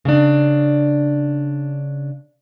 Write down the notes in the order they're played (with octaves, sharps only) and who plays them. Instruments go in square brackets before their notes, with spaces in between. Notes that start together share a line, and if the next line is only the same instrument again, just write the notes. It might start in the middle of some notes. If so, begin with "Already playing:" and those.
[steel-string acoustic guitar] C#3 D4